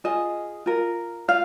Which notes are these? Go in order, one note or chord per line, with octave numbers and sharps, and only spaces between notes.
F4 G#4 D#5
F4 A#4
F4 F5